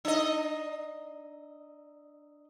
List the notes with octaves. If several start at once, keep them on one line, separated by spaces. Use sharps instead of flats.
D4 D#5